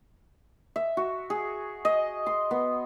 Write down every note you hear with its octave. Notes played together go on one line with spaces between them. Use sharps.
E5
F#4
G#4
D#5
C6
B3